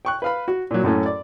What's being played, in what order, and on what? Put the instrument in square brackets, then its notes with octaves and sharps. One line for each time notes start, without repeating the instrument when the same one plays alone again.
[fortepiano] G5 C#6 F#6
B4 F5 B5
F#4
A#2 F#3
F#2 A2 A3 C#4
D5